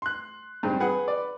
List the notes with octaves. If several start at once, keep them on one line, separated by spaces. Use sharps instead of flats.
C6 F#6
G2 G#3 C4
G#4 B4 F#5
D5